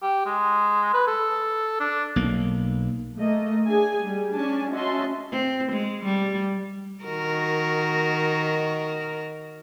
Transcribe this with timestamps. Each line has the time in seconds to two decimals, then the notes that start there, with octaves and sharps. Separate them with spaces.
0.02 G4
0.26 G#3
0.94 B4
1.07 A4
1.80 D4
2.16 B1 A#3
3.18 A3 A#3 D#5
3.68 D4 G#4 G#5
4.02 G3
4.33 C#4 D4 G#5 A5
4.72 C#4 F#4 D#5 E5 A5 C6
5.32 C4
5.72 G#3
6.05 G3
7.04 D#3 F#4 A#4